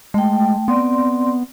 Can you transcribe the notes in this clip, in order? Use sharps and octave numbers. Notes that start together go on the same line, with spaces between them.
G#3 A3 G5
B3 C4 D5 C6